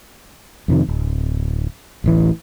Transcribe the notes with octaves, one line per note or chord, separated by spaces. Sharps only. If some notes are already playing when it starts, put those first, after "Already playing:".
F2 C3 D#3
D1
D1 A1 E3